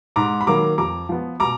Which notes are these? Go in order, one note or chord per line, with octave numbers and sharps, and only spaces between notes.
G#2 A#5 D6
B5
D#3 F#3 A#3 A#5 D6
F2 A#5 D6
F3 B3
B2 A#5 D6